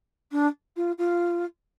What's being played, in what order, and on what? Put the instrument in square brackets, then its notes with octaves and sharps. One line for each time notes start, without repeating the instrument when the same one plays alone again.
[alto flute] D4
F4
F4